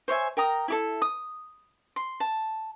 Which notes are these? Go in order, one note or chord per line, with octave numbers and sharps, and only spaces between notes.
C5 C#5 E5 G#5
A#4 G5 A#5 D#6
E4 G4 A4
D#6
C6
A5